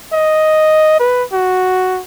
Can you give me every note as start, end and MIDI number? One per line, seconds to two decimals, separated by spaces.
0.13 0.99 75
1.00 1.23 71
1.33 2.01 66